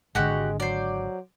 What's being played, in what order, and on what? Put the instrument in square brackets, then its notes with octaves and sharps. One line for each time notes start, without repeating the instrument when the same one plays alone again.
[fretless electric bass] G#1 D3 [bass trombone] G#3 [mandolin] F#4 G4 F#5
[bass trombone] F#3 [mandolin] C5 D5